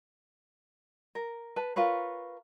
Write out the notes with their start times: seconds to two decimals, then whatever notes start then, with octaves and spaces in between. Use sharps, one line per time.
1.15 A#4
1.56 B4 A5
1.76 F4 A#4 B4 C#5